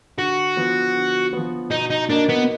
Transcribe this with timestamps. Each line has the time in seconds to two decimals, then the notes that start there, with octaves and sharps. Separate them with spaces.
0.18 D3 F#4
0.56 F3 B3
0.94 D3
1.33 F3 B3
1.71 B2 D#4
1.90 D#4
2.10 A#3 D4 D#4
2.29 B3